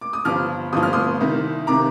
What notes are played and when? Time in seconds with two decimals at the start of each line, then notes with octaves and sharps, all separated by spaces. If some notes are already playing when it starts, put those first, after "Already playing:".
0.01 D6
0.13 D#6
0.25 G1 G2 F3 D6 F6
0.73 G1 G2 F3 D#6
0.83 F6
0.93 C6 D#6
1.21 C2 C3 D#3
1.67 C3 D#3 A#5 D6